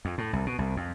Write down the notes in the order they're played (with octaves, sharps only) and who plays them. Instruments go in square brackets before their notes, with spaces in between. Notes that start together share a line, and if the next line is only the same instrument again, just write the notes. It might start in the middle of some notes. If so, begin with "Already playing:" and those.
[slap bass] F2
A2
C2
B2
C2
F2